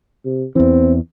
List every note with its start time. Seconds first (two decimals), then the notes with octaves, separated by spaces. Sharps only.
0.25 C3
0.56 E2 E3 C4